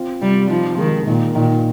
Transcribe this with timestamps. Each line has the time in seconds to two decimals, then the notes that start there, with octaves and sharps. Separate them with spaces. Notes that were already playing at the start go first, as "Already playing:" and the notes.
Already playing: C4 F4
0.21 C3 G3
0.50 F3 D#4
0.78 D#3 G#3
1.07 A#2 D#3
1.35 A#2 D#3